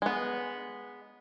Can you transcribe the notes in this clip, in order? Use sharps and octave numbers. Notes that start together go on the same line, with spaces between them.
G#3 B3